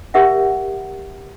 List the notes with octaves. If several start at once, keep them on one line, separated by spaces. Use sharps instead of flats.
G4 A#4 E5 F#5